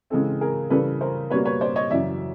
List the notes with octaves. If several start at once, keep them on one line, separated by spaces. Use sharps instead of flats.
C#3 E3 G#3 C4 A4
G#4 A#4
C#3 E3 G3 A4 B4
A#4 C5
B2 G3 A#3 B4 C#5
B4 C#5
C5 D5
C#5 D#5
F#2 C#3 E3 D5 E5